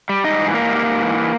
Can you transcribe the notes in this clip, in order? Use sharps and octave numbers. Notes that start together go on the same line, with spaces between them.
G3
G#2 D#4 D#5
E3
G#2 A#3 A#4
G3
G#2
E3